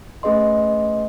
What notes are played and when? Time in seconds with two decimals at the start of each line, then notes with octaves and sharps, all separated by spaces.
0.23 A3 C#4 G#4 B4 D#5 C6